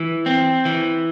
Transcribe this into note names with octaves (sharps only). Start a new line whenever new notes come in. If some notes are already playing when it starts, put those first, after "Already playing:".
Already playing: E3
C4
E3